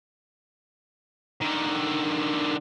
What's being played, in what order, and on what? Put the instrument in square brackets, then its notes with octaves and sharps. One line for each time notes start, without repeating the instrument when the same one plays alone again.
[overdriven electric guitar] D3 D#3